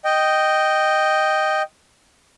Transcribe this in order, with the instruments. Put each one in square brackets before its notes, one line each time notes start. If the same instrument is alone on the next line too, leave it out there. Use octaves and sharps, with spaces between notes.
[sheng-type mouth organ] D#5 G5